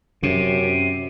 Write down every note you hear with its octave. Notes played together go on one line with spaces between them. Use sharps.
F#2 C3